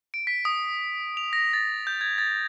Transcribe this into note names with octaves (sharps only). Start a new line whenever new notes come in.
D7
B6
D#6
F7
A#6
A6
G6
G#6
A6